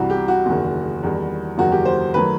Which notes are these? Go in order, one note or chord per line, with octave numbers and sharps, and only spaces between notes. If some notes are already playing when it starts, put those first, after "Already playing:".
Already playing: C2 C3 E3 G3 F#4
G4
F#4
F#1 E2 D#3
E2 D#3 G3
F#1 E2 D#3 F#3 F#4
G4
C5
D#3 F#3 A3 B4